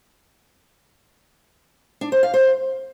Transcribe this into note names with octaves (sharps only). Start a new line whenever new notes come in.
D4
C5
F5
C5